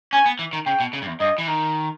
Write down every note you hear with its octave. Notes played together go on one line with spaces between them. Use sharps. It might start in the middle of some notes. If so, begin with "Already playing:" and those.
C#4 G#5
B3
E3
D#3
C#3 G5
B2
C#3
G2
E2
G2 D#5
E3
D#3